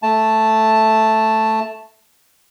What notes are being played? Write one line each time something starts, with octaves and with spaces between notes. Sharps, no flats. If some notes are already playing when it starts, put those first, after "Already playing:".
A3 A5